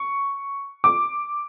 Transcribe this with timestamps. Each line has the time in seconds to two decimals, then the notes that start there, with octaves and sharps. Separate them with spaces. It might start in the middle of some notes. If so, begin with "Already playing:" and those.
Already playing: C#6
0.84 D6